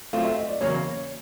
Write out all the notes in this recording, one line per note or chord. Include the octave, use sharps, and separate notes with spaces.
F#3 A3 C4 F4 F5
E5
D#5
D5
E2 C#3 F#3 A#3 C#5